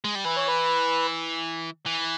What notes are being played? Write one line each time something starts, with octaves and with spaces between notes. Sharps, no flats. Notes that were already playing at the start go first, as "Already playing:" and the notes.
G#3
G3
E3 B4
C#5
B4
E3